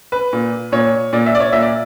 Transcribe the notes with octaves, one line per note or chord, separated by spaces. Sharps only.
B4
A#2
A#2 C#5
A#2 D5
E5
D5
C#5
A#2 E5
D5